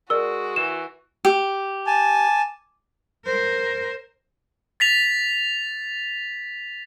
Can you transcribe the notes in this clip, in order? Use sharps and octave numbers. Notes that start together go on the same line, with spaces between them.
G#3 F#4 A#4 D5 E6
E3 E7
G4
G#5 A5
A#4 C5
A6 B6 F7